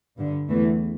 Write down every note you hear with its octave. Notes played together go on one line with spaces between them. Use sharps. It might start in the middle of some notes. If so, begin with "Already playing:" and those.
G2 D3
E2 E3 A3